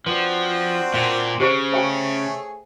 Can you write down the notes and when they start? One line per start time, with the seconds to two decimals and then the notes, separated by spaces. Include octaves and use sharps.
0.06 F3 C4 D4 F#4 B4
0.94 A#2 F5
1.40 C#3 G4 C5 C#6
1.73 A3 G#4 C5 C#5 F5 G5